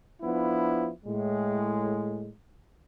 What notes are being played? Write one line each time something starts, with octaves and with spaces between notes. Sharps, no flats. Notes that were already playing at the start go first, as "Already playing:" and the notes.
F3 B3 D4 E4
A2 G#3